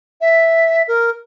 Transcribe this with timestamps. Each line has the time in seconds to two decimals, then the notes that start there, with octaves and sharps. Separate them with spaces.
0.21 E5
0.88 A#4